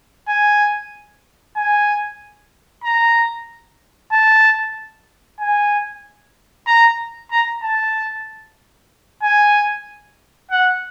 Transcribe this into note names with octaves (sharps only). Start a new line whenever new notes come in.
G#5
G#5
A#5
A5
G#5
A#5
A#5
A5
G#5
F#5